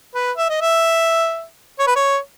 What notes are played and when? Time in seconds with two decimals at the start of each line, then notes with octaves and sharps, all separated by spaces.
0.15 B4
0.37 E5
0.50 D#5
0.61 E5
1.79 C#5
1.87 B4
1.96 C#5